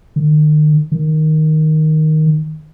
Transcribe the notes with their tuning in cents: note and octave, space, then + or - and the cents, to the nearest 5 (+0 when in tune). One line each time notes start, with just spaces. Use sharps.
D#3 -40
D#3 +0